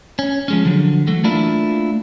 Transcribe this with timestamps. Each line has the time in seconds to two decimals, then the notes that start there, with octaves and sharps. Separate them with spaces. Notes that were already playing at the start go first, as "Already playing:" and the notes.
0.19 C#4
0.48 F3 G#3 C#4
0.65 D3 F3 F#3
1.07 E3 F#3 A3
1.24 A3 A#3 D4 E4 F4